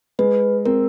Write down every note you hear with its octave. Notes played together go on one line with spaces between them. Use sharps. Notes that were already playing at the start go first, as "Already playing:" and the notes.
G#3 B4
C4 A#4